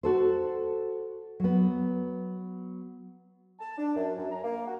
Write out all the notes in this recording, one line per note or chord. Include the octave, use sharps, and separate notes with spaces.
F#4 A4 C5
F#3 B3
A5
D4
F#2
F#2
A#5
A#3
F#4